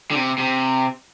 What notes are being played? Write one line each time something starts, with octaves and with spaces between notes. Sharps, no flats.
D3
C3
C3